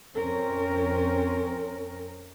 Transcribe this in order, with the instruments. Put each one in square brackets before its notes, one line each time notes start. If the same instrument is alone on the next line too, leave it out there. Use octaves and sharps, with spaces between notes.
[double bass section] F2 C4 C#4 [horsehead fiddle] A#4